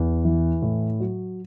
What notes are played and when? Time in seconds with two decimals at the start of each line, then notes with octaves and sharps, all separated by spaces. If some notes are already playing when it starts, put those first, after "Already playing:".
Already playing: E2
0.25 E3
0.62 A2
1.00 F#3